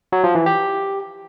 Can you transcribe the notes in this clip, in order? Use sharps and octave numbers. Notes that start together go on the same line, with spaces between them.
F#3
F3
E3
G4